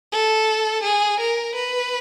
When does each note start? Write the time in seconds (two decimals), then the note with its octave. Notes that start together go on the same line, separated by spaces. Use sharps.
0.12 A4
0.83 G#4
1.20 A#4
1.55 B4